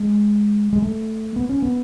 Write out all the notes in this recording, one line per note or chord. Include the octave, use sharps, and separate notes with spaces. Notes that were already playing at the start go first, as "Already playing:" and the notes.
Already playing: G#3
G#3
A3
B3
C#4
B3